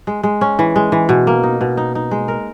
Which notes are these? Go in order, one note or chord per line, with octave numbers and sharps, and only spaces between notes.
G#3
G#3
C#4
E3
G#3
E3
B2
A#3
D#4
B2
D#4
D#4
G#3
A#4